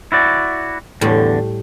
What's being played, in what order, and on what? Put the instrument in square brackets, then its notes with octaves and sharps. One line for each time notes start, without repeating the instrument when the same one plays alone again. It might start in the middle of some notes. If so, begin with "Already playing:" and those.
[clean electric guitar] E4 F#4 D5
[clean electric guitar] E2 D3 [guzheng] A2 G3 G4